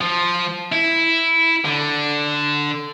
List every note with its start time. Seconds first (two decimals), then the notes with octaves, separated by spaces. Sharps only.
0.01 F3
0.72 E4
1.65 D3